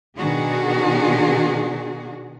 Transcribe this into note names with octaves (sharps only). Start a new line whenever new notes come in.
B2 D#3 D4 F#4 G#4